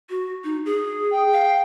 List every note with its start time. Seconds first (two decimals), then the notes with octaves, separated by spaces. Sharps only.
0.10 F#4
0.44 D#4
0.66 G#4
1.12 G5
1.33 F5